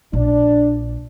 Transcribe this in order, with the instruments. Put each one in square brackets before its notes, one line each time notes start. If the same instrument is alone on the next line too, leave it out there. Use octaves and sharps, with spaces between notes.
[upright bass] A#1 [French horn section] D4